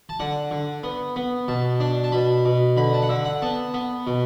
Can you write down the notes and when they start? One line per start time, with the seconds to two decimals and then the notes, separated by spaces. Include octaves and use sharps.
0.09 A5
0.19 D3 F#5
0.51 D3
0.83 B3
1.16 B3
1.48 B2 A5
1.80 D4
2.04 A5
2.12 B2 B5
2.45 B2
2.77 D3 B5
2.94 A5
3.02 F#5
3.09 D3 E5
3.25 F#5
3.42 B3 A5
3.74 B3
4.07 B2